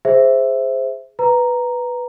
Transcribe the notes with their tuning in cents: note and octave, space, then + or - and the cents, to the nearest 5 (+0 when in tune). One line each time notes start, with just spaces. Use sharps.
G#4 +0 C5 +0 E5 +0
B4 +0 A#5 +0